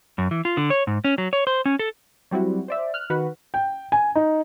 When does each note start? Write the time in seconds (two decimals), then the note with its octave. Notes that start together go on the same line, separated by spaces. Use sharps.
0.18 F#2
0.31 E3
0.45 F4
0.57 D3
0.70 C#5
0.87 G#2
1.04 C#4
1.18 F#3
1.33 C#5
1.47 C5
1.65 C#4
1.79 A4
2.31 F#3 G3 C4 E4 F#4
2.68 C5 D5 E5
2.94 F6 F#6
3.10 D#3 F#4 B4
3.54 G5
3.92 G#5
4.15 D#4